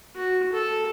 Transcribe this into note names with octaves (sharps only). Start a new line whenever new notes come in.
F#4
A4